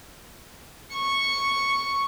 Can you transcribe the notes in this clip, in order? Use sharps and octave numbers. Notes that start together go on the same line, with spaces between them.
C#6